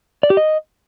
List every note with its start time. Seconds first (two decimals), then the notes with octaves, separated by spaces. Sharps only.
0.23 D5
0.30 G4
0.37 D#5